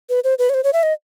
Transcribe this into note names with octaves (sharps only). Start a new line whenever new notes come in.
B4
C5
B4
C#5
C5
C#5
E5
D#5